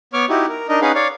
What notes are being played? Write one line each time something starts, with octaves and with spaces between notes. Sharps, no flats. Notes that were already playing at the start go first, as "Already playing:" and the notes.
B3 C#5 C#6 D6 F6
D#4 E4 F#4 G4
A#4
D4 D#4 A#4 D#5
C#4 D#4 G#4 B4 F5 F#5
C#5 D5 F5